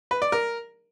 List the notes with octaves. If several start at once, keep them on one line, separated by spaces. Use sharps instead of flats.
B4
D5
A#4